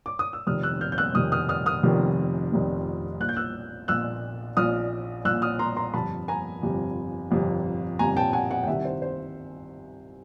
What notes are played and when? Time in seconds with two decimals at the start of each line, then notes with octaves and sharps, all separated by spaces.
0.06 D6
0.19 D#6
0.33 E6
0.47 F1 F2 C3 D#3 D#6 F6
0.63 E6 F#6
0.81 F6 G6
0.92 G6
0.98 E6 F#6
1.15 F1 F2 C3 D#3 D#6 F6
1.32 D#6 F6
1.49 D#6 F6
1.66 D#6 F6
1.83 F1 F2 C3 D#3
2.52 F1 F2 C3 D#3
3.20 A#1 A#2 F#6
3.29 G6
3.36 E6 F#6
3.88 A#1 A#2 E6 F#6
4.57 A#1 A#2 D#6 F6
5.25 A#1 A#2 E6 F#6
5.42 D#6 F6
5.59 A#5 C6
5.76 A#5 C6
5.94 G1 F2 C3 A5 B5
6.28 G#5 A#5
6.62 G1 F2 C3
7.31 G1 F2 C3
7.99 G1 F2 C3 G#5 A#5
8.17 G5 A5
8.33 F#5 G#5
8.51 F#5 G#5
8.63 G5
8.67 C2 C3 D#3 E5 F#5
8.85 C5
9.02 C5